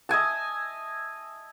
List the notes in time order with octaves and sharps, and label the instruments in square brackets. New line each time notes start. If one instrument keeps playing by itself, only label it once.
[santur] D#5 E5 G#5 A5